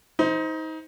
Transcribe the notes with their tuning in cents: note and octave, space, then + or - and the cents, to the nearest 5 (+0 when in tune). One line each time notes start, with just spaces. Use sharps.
D#4 +30 C5 -10